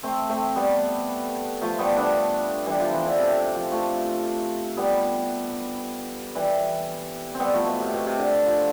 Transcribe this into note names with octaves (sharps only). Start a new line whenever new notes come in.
A3 C4
A3 C4
G3 B3
F3 A3
G3 B3
B3 D4
E3 G3
F3
E3
D3
C3
F3
F3 A3
G3 B3
E3 G3
C4
G3 B3
F3 A3
B2
C3
B2
C3
D3
F3